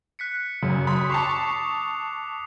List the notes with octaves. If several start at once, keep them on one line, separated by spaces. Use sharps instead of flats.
F#6 B6 C#7
F#2 C#3
B5 D#6
A5 C#6 D6 C7 F7